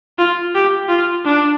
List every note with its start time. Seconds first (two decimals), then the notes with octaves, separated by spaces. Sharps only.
0.18 F4
0.54 G4
0.89 F4
1.25 D4